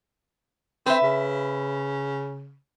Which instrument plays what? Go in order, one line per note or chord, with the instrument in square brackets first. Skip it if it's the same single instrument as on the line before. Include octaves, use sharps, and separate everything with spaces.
[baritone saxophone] C4 [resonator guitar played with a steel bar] B4 E5
[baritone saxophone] C#3